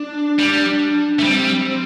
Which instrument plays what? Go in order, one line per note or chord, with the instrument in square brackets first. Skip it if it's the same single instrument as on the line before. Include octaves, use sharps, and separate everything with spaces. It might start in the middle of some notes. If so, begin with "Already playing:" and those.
Already playing: [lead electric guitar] D4
[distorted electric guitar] G3
A3
[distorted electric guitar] G3 [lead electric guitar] C4